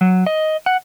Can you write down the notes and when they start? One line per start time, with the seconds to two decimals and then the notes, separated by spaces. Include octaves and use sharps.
0.01 F#3
0.27 D#5
0.66 F#5